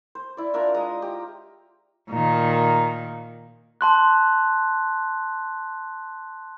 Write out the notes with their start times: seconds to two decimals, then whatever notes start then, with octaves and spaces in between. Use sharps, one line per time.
0.15 C5
0.37 E4 D5
0.54 D4 F4 A#4 E5
0.74 G#3 A#5 D#6
1.02 G4
2.10 A#2 D#3
3.81 A5 C6 F#6